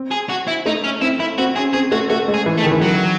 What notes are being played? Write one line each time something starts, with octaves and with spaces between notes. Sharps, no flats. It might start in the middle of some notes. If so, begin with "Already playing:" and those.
Already playing: C4
G#4
F#4
E4
A3 D#4
C#4
C4 E4
E4
C4 F#4
C#4 G#4
C4 G#4
A3 F#4
A3 F#4
G#3
G#4
E3
A3
D#3
E3
D#3 F#3